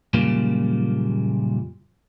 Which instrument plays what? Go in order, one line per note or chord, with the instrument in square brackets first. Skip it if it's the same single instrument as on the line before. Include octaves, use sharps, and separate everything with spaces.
[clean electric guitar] F#2 A#2 C#3 F3 G3 A#3